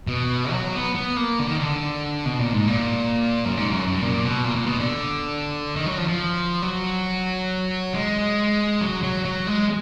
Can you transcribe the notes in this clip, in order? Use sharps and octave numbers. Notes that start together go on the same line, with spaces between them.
B2
F#3
B3
B3
A#3
D3
D#3
D3
B2
A#2
G#2
A#2
F#2
G#2
F#2
F#2
A#2
B2
A#2
A#2
B2
D3
D#3
F#3
F3
F3
F#3
G#3
F#3
F#3
F#3
G#3